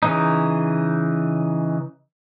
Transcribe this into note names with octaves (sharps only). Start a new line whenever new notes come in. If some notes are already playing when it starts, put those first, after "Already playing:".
C#3 E3 D#4